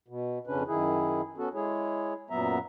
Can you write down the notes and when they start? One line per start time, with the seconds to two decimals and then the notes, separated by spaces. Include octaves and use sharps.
0.08 B2
0.47 F2 C#3 C#4 D4 B4
0.68 F#2 D#3 E4 G#4
1.38 B3 C#4 F#4 A4
1.54 G#3 E4 G#4 C#5
2.30 F#2 A#2 F#3 B3 E5 A#5